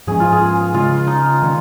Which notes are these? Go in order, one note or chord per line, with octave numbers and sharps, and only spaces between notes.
G#2 F3 G#3 C#4 G#4
F4
G#4
C#3 G#3 C#4 F4
D#4
D#3 C#4